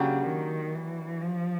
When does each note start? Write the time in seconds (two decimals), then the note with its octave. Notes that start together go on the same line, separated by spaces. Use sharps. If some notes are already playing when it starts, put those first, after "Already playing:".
Already playing: C#3 F#3 A#3 D4 G4
0.27 D#3
0.75 E3
1.22 F3